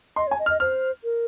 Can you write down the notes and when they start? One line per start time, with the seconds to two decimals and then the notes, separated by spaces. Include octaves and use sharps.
0.16 D#5 C6
0.27 C#5
0.31 G#5
0.39 D#5
0.46 F6
0.50 D#5
0.60 C5 F6
1.04 A#4